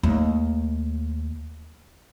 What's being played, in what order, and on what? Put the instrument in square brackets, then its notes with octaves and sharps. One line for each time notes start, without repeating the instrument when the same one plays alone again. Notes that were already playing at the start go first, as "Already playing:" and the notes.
[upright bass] D#2 A3